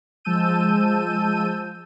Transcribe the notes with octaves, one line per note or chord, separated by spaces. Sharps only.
F3 G#3 A5 E6 G6 D#7